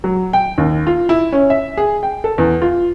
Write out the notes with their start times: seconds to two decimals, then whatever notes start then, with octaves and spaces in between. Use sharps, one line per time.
0.04 F#3
0.33 G5
0.58 D#2
0.87 F4
1.09 E4
1.32 C#4
1.50 E5
1.77 G#4
2.03 G5
2.24 A4
2.38 E2
2.62 F4